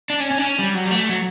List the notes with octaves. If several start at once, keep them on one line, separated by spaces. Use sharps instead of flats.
D4
C#4
C#4
D4
C#4
G3
F#3
G3
A3
F#3